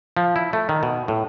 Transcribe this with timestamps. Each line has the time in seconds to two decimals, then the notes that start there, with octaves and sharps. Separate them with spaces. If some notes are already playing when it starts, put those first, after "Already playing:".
0.17 F3
0.36 E4
0.53 A3
0.69 D#3
0.83 B2
1.08 A2